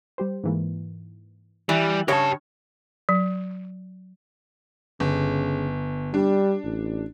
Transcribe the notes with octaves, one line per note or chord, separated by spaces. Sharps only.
G3 G4 C5
G#2 E3 A#3
E3 G3
C#3 D4 G4 C#5 A5
F#3
G1 C#3
G3 D4
A1